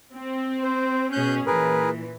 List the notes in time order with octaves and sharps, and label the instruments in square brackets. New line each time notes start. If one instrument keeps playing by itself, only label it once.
[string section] C4
[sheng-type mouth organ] C5
[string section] B2 C#4 G#4 [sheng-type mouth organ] F#6 G6
[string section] A#2 E3 [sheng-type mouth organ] G#4 A#4 B4